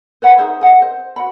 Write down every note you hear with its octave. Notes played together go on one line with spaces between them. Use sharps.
B4 C#5 F#5 B5
D#4 G#4 C5 E5
G#4 D#5 F#5 G#5
C5
F#4 F#5 B5